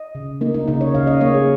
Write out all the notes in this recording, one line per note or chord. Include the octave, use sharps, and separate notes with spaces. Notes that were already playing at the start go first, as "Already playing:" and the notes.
Already playing: D#5
C#3
A#3 D#4
D#4
C#3 D#4
C#5
C#3 F5
D#5
A#3 C#5
G#4